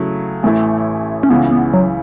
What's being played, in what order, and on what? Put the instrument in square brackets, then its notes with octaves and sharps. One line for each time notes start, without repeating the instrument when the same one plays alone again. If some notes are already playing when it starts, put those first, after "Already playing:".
Already playing: [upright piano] C#3 F#3 A3 E4
A1 A2 E3 A3 E4
[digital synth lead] C#4
[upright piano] C#2 C#3 E3 [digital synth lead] B3
[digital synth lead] B3
F#3